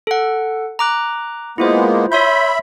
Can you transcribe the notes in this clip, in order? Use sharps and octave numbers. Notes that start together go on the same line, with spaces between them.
A4 F#5
A#5 D6 F#6
G#3 A#3 B3 E4 F4 C5
C#5 E5 B5 C6 G6